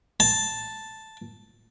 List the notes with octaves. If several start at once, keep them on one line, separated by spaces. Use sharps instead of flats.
A5